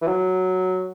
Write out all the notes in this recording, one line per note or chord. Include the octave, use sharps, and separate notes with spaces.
E3
F#3